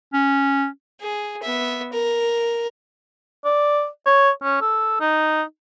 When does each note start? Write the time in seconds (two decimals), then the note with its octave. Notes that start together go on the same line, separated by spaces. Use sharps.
0.14 C#4
1.01 G#4
1.42 B3 E5
1.92 A#4
3.45 D5
4.06 C#5
4.43 C#4
4.61 A4
5.01 D#4